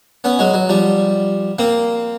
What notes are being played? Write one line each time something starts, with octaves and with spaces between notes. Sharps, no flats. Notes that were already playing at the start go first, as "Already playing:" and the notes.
B3 C#4
F#3 G#3
F#3
F3 G3
A#3 C4